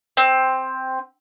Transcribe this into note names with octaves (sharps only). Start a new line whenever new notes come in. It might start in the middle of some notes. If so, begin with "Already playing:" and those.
C4